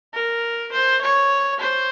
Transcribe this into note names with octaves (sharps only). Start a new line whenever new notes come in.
A#4
C5
C#5
C5